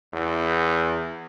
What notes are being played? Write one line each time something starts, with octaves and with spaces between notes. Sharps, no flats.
E2